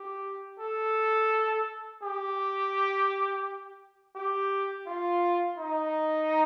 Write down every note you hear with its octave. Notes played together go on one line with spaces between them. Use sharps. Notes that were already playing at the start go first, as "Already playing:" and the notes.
Already playing: G4
A4
G4
G4
F4
D#4